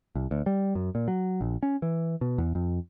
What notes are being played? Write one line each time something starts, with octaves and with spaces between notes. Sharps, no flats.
C2
D2
G3
F#2
A#2
F#3
A#1
C#4
E3
B2
E2
F2